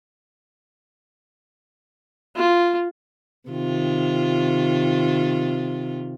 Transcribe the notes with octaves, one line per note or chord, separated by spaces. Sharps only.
F4
C3 D#3 F4